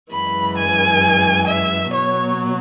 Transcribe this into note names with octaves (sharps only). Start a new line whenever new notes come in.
F#2 E3 G#3 B5
G#5
E5
B2 F#3 C#5